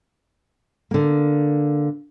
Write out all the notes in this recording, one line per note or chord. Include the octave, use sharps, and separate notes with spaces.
D3 A#3